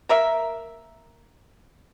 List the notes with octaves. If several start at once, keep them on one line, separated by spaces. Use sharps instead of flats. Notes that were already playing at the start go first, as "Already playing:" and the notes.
A#3 A#4 E5